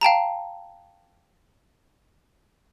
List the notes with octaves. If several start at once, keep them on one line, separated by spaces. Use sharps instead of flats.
F5 G5 A5 A#5